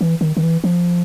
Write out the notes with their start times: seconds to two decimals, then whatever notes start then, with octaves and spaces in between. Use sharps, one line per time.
0.01 E3
0.21 D#3
0.37 D#3
0.43 E3
0.64 F3